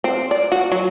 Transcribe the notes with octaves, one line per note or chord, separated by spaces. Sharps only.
C4
D5
F#4
F#3